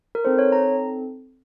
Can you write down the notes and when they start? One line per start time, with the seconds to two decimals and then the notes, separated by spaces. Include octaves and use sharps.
0.15 A#4
0.25 C4 D#4 A4 C5
0.39 C#5
0.52 A#5